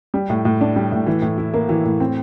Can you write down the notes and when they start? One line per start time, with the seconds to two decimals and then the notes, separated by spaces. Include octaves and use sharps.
0.14 G3
0.30 A2
0.45 A2
0.61 D4
0.76 G3
0.92 A2
1.07 E3
1.22 A2
1.38 E4
1.54 A#3
1.69 E3
1.85 A2
2.00 C4